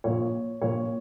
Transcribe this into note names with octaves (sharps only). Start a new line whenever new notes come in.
A#1 A#2 C#5
A#1 A#2 C#5